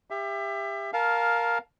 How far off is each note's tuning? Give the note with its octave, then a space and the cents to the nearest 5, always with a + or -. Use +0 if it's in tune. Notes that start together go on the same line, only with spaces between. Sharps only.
G4 +25 E5 +20
A#4 +0 F5 +10 A5 -20